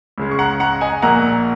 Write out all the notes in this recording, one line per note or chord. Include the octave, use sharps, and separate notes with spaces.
C#2 C#3 G#3
C#6
F#5 A#5
F#5 A#5
D#5 G#5
A#1 A#2 A#3 F#5 A#5